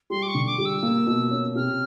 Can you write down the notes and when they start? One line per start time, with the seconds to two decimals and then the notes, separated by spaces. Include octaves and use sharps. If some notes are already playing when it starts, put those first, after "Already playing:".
0.10 G3 C6
0.23 D6
0.28 C#6
0.34 D3
0.46 D6
0.58 G3
0.65 E6
0.83 A#3
1.07 B2
1.31 C#4
1.55 C3 F6